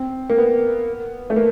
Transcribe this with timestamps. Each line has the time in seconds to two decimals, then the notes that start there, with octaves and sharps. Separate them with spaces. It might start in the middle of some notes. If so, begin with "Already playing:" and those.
Already playing: C4
0.30 A#3
0.38 B3
1.30 A3
1.36 A#3